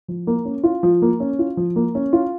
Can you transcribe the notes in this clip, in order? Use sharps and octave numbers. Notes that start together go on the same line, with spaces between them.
F3
A#3
C#4
F4
F3
A#3
C#4
F4
F3
A#3
C#4
F4